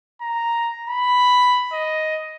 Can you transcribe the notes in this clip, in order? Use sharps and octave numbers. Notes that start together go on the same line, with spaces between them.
A#5
B5
D#5